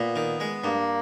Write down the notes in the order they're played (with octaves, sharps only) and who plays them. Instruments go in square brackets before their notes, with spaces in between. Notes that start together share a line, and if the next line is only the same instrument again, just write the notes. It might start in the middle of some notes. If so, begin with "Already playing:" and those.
Already playing: [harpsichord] A#2 [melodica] B3
[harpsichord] D#3
G#3
[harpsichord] G2 [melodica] A#3